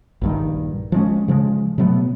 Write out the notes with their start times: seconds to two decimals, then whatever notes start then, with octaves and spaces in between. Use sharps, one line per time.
0.22 A#1 G2 D#3
0.92 F3 G#3 C#4
1.28 C#3 F3 G#3
1.78 B2 F#3 A3 B3